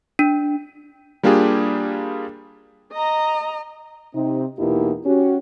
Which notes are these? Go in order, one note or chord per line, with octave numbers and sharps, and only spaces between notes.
D4
G3 A#3 D4 F4 G4 G#4
D#5 A#5
C3 C4 D#4
E2 B2 A#3 D#4 E4 G4
C#4 F#4 G4